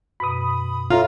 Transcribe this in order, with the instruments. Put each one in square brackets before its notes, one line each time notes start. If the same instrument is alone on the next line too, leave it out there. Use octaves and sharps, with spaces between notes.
[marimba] F#2 B2 [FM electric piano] B5 D#6
[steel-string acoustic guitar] F4 [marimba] A4 C#5 E5 [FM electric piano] A#5 F6